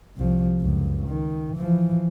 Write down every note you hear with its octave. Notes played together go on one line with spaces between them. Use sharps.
C2 F3
C#2 F#2
D#3
E3 F3